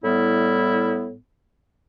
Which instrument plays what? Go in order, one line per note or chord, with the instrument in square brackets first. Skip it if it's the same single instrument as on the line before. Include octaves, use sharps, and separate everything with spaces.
[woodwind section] A2 G3 B3 E4